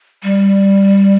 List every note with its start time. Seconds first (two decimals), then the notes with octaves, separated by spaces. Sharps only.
0.23 G3